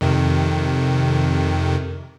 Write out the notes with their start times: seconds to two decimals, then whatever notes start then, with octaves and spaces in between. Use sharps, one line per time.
0.01 F2 C3 D#3